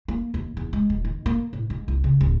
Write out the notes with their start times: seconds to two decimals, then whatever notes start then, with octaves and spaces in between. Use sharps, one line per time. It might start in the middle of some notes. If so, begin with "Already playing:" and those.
0.08 A#3
0.34 D#2
0.57 E2
0.73 G#3
0.90 D#1
1.05 D#3
1.26 A#3
1.53 A2
1.70 G#2
1.88 C2
2.04 C#3
2.21 D1